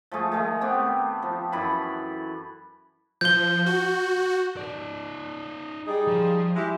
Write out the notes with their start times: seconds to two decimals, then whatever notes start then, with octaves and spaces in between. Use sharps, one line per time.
0.12 F3 G#3 A3 G#4
0.32 D#3 G#3 A3
0.61 B3 C4 G4
1.22 F3
1.52 F#2 E3 B5
3.21 F3 G6 G7
3.66 F#4
4.57 D#4 D5
5.86 G3 D#4 G#4
6.07 F3
6.55 G#3 E4 G4